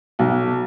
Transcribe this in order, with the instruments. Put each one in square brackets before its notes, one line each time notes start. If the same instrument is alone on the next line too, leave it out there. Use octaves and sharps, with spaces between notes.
[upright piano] B1